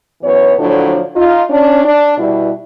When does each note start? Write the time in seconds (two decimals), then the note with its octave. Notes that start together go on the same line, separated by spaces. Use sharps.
0.22 F#2 E3 B3 C#5
0.58 A2 D3 F3 F#3 D4
1.16 D#4 F4
1.50 C#4 D4
1.85 D4
2.18 B2 G3 E4